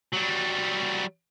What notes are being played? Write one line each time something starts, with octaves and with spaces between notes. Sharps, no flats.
F#3 G3